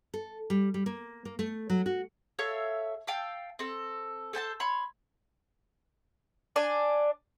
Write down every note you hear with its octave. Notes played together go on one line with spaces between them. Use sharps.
A4
G3
G3
A#3
A#3
A3
F#3
F#4
A4 C#5 E5 F5
F5 G5 A5 E6
C4 A4
A4 C5 G#5 A5
C#5 B5 C6
D4 D5 G#5